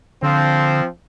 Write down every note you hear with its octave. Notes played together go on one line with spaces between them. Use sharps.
D3 F3 C4